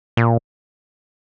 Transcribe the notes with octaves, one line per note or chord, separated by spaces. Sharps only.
A#2